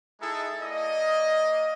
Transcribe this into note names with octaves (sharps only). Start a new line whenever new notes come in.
G#3 D#4 E4 G#4 A4
A#3 D5 D#5